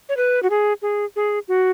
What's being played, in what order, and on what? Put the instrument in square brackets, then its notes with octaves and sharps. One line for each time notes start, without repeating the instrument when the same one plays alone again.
[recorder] C#5
B4
F#4
G#4
G#4
G#4
F#4